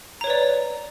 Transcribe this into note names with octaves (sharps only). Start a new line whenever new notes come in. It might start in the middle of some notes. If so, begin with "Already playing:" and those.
B4 C#5 D5 A#5